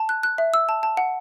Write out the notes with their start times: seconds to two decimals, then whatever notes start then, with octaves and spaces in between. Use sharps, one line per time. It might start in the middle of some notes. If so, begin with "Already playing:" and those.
Already playing: A5
0.09 F#6
0.23 F#6
0.38 E5
0.54 E6
0.69 A5
0.83 A5
0.97 F#5